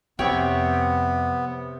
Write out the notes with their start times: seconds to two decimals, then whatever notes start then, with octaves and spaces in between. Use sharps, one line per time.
0.19 F2 C3 B3 C#5 G5